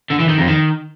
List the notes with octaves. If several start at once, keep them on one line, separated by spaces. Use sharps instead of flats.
D3
E3
D#3
F2
D#3